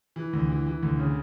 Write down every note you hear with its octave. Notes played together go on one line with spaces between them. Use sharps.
E3
D2
E3
E3
D2
C#3